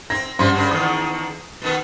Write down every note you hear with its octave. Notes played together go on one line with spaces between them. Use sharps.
C4 A#6
G2 F3 F#3 C#4 C5 C6
F#2 C#3 D4
E2 D3 D#3 D#6
B2 D#3 B3